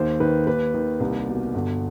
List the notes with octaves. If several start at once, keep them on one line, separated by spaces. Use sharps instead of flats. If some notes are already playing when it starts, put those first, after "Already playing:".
Already playing: D#2 D#3 C5
D#3 B4
D#2 B4
D#3
C2
B2
G1